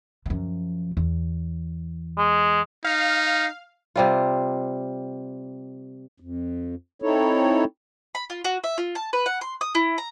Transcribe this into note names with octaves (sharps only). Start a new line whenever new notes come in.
F#2 F3
E2
G#3
D#4 F5
C3 G3 F4
F2
C4 D#4 E4 A4 C#5
B5
F4
F#4
E5
F4
A5
B4
F#5
C6
D#6
E4
A#5